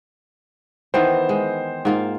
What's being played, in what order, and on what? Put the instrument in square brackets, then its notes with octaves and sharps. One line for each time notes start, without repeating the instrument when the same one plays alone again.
[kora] D#3 E3 B3 [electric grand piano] C5 G5
[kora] G#3
G#2 A#3 F4